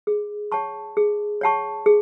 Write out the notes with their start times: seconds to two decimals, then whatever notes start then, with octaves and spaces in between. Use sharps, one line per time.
0.07 G#4
0.52 C#5 F#5 A5 C#6
0.97 G#4
1.41 C#5 F#5 A5 C#6
1.86 G#4